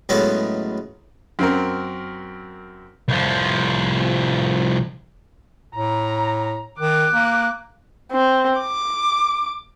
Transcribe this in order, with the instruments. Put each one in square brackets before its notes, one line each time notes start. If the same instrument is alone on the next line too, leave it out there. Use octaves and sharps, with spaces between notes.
[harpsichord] A2 F#3 G#3 B3 C#4
[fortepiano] F#2 C4 A#4
[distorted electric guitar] C2 F3
[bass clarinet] A2 [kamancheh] A#5
[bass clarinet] D#3 [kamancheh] D6 F#6
[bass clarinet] A#3
[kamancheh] C4
D6